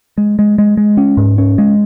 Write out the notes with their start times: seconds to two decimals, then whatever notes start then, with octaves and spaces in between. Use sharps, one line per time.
0.18 G#3
0.39 G#3
0.58 G#3
0.77 G#3
0.97 C#4
1.17 G#2
1.38 C#4
1.58 G#3